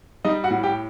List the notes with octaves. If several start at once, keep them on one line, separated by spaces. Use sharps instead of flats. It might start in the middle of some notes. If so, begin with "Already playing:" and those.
G3 D#4 D#5
F#4 F#5
A2
G4 G5